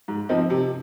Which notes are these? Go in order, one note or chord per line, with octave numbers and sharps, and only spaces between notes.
G#2
F3 C4 D#4
C3